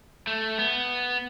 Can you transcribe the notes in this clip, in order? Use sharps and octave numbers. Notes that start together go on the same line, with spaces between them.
A3
B3